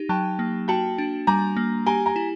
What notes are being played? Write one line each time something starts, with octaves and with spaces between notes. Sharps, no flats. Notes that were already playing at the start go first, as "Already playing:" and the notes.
Already playing: D#4 G4
F#3 G5 A5
A#3
F#4 G5 A5
D4
G3 G#5 A#5
A#3
G4 G#5 A#5
G#5 A#5
E4